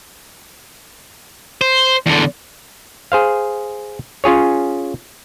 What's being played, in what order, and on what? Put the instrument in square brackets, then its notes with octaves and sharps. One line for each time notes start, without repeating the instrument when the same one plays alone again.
[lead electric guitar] C5
E2 D3
[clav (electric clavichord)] G#4 C5 F5
C#4 F4 G#4 C#5